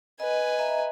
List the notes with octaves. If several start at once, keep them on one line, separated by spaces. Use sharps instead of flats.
B4 D#5 G#5
D#5 E5 A#5